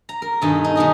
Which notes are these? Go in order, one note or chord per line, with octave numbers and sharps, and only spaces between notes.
A#5
A#4
G2 B2 D#3 A4 G#5
D#4
B2 D#3 G#4 D#5